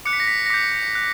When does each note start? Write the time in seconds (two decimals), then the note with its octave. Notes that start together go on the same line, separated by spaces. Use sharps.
0.05 D6 F#6 C#7
0.13 B6
0.20 A#6
0.27 B6
0.46 A#6
0.50 D6 G6 B6
0.95 F#6